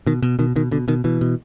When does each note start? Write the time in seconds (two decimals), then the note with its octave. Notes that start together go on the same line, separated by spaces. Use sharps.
0.07 B2 D#3
0.22 B2
0.39 B2 D#3
0.56 B2 D#3
0.71 B2 D3
0.88 B2 D#3
1.04 B2 E3
1.21 B2